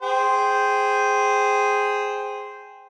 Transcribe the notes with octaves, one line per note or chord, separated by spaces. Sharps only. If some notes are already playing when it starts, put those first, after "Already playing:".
G#4 C5 G5